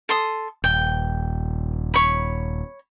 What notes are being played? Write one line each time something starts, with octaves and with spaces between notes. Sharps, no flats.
A4 C6 D#6
D#1 G5
C#5 B5